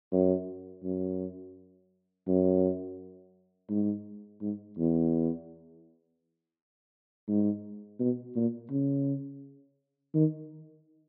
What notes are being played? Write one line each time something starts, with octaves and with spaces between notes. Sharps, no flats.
F#2
F#2
F#2
G#2
G#2
E2
G#2
B2
A#2
C#3
D#3